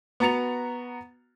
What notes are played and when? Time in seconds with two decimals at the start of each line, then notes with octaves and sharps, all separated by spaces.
0.20 B3 F#4 A#5 A6 C#7 F7